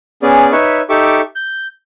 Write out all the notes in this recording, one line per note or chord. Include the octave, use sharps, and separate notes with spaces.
B3 C#4 G#4 D5
D#4 B4 C#5 E5 C#6
D#4 G4 A4 E5 C#6 D6
G6